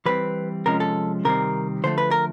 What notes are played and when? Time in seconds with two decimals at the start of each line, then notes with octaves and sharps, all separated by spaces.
0.06 E3 G3 C4 B4
0.66 C3 F3 G#3 C#4 A#4
0.80 A4
1.25 C3 D#3 G3 C4 A#4
1.84 D3 F3 A3 C5
1.98 B4
2.11 A#4